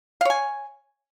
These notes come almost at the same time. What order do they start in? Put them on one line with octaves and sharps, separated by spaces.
F5 C#5 G#5